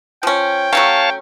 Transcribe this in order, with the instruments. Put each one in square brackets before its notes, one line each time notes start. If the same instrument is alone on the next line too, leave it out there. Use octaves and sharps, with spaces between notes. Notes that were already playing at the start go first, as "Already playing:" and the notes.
[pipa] F3 C#4 [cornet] G5
[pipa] F#3 A3 C#4 [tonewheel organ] C#5 F5 A5